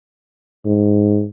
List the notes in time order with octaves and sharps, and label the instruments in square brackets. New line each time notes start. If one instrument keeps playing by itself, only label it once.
[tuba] G#2